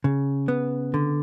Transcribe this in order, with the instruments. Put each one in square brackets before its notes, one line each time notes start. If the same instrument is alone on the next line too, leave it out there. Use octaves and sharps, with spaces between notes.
[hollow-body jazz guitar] C#3
B3
D3